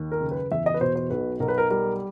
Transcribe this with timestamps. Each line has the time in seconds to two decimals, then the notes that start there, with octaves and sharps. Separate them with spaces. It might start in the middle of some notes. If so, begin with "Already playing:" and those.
Already playing: D#2
0.11 A#4
0.21 F#1
0.31 B4
0.52 E2 E5
0.66 D#5
0.74 B4
0.81 B2 C5
0.96 C5
1.10 B1 B4
1.40 B1 A#4
1.48 B4
1.58 A#4
1.70 G3 A#4